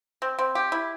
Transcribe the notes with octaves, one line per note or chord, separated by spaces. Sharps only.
C4
C4
G4
E4